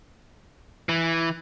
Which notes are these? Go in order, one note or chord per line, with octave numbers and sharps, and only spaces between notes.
E3